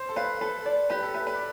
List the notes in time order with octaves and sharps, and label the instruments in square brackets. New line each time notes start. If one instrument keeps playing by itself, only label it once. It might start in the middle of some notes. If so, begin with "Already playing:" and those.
Already playing: [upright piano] C5
A4
[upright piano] B4 [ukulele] F5
[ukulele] A4 [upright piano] B4
[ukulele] D5
[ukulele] G4 [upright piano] B4
[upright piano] A4
[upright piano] B4 [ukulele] E5
[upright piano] B4
D5